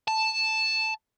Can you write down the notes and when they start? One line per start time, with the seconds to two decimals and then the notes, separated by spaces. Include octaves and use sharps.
0.08 A5